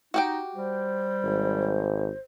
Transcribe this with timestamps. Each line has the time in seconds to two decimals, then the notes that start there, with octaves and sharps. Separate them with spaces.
0.14 D#4 F#4 G4 G5
0.56 G3 C5
1.24 G#1